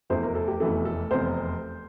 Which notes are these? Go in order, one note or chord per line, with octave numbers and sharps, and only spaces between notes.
F1 E2 E3 A3 C5
A#4
A4
G4
F1 E2 E3 A3 A4
A4
F1 E2 C3 C5